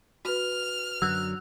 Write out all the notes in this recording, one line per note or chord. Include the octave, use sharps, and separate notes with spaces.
F#4 B4 F6
F#2 D3 F#3 E6 F#6